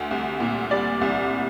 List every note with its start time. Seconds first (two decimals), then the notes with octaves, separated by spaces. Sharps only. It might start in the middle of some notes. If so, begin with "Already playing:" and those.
Already playing: D2
0.11 C2
0.40 A#2
0.71 G3 D5
1.01 C2